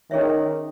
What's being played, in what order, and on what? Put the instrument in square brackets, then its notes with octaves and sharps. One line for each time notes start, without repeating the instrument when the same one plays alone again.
[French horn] D#3 [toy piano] C#4 G#4 C#5 E5